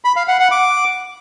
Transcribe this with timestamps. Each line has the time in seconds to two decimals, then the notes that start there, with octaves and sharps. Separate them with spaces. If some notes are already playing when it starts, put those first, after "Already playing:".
0.05 B5
0.16 F5
0.28 F#5
0.40 F#5
0.51 D6